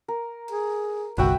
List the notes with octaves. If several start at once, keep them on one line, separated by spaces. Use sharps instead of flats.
A#4
G#4
G1 C2 F#4 B4 E5 G5